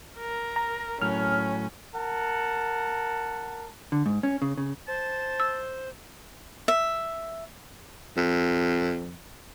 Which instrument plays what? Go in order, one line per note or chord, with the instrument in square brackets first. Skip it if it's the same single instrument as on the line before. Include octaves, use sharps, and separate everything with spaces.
[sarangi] A#4
[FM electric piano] A#5
[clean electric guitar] A2 F#3 [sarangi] C#4 [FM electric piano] F6
[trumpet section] A#4 F#5 A5
[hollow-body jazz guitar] D3
G#2
C#4
C#3
C#3
[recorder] C5 [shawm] A5
[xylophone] E6
[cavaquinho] E5
[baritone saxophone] F2